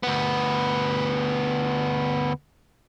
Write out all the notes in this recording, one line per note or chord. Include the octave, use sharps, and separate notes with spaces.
D2 B3